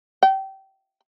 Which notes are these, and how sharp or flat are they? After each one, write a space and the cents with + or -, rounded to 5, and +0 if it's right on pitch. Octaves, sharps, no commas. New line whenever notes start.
G5 -25